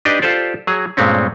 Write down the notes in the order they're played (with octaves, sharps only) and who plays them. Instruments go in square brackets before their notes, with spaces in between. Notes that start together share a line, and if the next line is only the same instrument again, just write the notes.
[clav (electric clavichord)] D4 D#4 G4 B4 D5 D#5
F4 G4 A4 C5 D5
F#3 G#4 A#5
G2 A#2 G#3 A3 C4 C#4